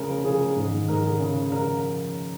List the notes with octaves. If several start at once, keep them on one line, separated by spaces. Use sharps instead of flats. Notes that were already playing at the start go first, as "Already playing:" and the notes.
Already playing: C#3 G#3 A#4
F3
C#3 G#4
G#3
G#2
D#3
G#2 A#4
G#3
C#3
F3
C#3 A#4